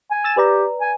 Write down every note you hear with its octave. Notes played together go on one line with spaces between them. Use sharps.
G#5
E6 A6 E7
G4 B4 D5 A#5
G#5